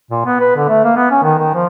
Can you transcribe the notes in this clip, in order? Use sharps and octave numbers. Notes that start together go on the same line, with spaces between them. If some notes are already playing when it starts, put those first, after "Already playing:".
A#2
B3
B4
D3
A3
A#3
B3
C#4
D#3
D#3
F3